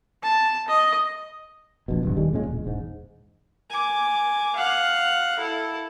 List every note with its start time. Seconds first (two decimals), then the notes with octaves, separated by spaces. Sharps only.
0.23 A5
0.68 D#5
1.88 F1 A#1 B2
2.03 D1 G2 B3
2.16 D#1 D#3 G3 G#3
2.33 C#2 A#2 C#3 G#3
2.47 E1
2.64 E1 G#2
3.70 G#5 D6
4.56 F5 F#5
5.39 E4 A4